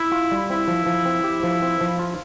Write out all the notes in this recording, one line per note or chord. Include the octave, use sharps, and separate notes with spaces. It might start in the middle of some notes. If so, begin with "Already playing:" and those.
Already playing: E4
F4
G3
C4 E4
F3
F3
C4
G4
F3
C4
F3
F4